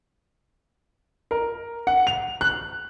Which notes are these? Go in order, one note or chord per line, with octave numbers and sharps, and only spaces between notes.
A#4
F#5
F7
F#6